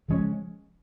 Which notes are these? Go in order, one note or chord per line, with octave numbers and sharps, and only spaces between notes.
C#3 F3 G#3 C#4